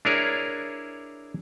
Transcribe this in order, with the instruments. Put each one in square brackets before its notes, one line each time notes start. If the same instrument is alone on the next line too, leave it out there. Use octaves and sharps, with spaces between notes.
[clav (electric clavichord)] D4 E4 G#4 A#4 C#5